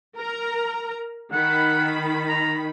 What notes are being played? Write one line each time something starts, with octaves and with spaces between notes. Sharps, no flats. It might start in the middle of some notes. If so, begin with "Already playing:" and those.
A#4 A#5
D#3 F#5 B5
A#5